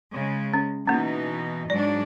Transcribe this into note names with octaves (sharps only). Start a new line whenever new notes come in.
C#3 G#3
C#4
B2 E3 A#3 C#4 D#4
G#2 F#3 D4 D5